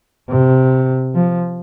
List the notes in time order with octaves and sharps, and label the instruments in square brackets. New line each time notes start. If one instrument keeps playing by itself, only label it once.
[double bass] C3
F3